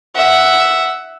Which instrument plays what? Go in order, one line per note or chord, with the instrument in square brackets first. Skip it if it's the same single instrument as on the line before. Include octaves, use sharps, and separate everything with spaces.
[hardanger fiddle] E5 F#5